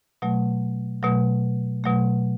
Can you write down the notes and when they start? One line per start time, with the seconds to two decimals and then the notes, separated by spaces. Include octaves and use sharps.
0.22 B2 F#3 A3
1.03 B2 F#3 A3
1.84 B2 F#3 A3